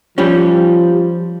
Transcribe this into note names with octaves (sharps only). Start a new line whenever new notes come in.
F3 G3 C#4